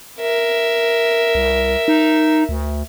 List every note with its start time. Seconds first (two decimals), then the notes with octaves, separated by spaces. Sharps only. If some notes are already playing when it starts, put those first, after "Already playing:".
0.20 A#4 E5
1.35 C2
1.88 D#4
2.49 D2